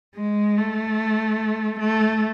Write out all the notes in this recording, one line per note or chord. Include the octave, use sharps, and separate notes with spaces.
G#3
A3
A3